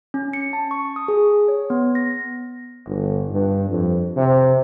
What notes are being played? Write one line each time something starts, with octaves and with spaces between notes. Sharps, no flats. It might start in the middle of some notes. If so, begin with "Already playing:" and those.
C#4
C#7
A5
C#6
D#6
G#4
C#5
B3
A#6
G1
G2
F2
C3